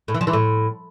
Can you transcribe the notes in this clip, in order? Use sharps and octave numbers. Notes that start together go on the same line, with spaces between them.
A2
E3
F3
E3
A2